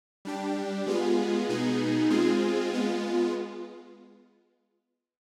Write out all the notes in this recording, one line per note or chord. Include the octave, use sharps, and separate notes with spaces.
G3 D4 G4
G#3 B3 F4 G#4
B2 B3 D#4 G#4
G#3 C4 F4 G#4
G#3 B3 F4